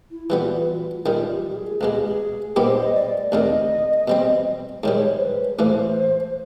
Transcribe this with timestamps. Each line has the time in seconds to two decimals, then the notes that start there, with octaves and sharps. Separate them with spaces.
0.11 E4
0.30 E3 G3 B3 F4
0.43 F#4
0.57 F4
1.05 F#2 D#3 G3 F4
1.31 G4
1.50 G4
1.56 G#4
1.80 C#2 B2 G#3 G#4
1.92 G4
2.04 G#4
2.56 A#2 G3 B3 D#4 G4 C5
2.83 D#5
2.95 D5
3.32 D2 C3 D#3 D#5
4.08 B2 G3 C4
4.84 G#2 D#3 G3 C#5
4.98 C#5
5.09 C5
5.21 B4
5.59 A1 A2 E3 C5